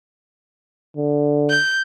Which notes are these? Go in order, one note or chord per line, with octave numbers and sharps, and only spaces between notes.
D3
G6